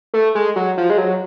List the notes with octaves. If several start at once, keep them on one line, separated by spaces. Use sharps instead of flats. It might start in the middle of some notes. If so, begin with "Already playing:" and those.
A3
G#3
F#3
F3
G#3
F#3